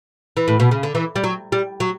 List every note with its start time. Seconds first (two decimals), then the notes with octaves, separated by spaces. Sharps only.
0.37 E3
0.48 A2
0.60 B2
0.71 C#3
0.83 D3
0.95 E3
1.16 G3
1.24 F#3
1.52 G3
1.80 F#3